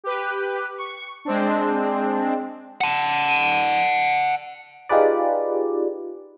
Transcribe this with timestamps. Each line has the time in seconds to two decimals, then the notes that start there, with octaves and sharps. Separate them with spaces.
0.04 G4 B4
0.78 C#6
1.25 G#3 C4 D4
2.81 F#5 A5
4.89 D#4 F4 G4 G#4 B4 D5